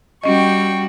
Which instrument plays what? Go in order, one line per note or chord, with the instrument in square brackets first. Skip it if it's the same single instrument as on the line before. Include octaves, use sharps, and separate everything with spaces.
[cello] G3 F#4 [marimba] C#4 D#5 [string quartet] G5 C#6